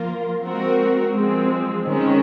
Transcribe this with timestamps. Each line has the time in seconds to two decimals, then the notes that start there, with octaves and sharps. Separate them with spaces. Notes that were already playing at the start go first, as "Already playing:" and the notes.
Already playing: F3 A#3 F4 A#4
0.42 G#3 C4 F#4 A#4
1.14 F3 G#3 C4
1.86 D#3 G#3 C#4